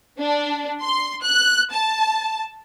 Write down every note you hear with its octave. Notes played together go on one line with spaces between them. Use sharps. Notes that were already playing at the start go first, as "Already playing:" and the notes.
D4
C6
F#6
A5